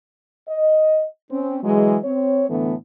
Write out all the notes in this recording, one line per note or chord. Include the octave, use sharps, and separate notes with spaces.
D#5
C4 C#4
E3 F#3 G#3
C4 C#5
A2 D3 E3 A3 B3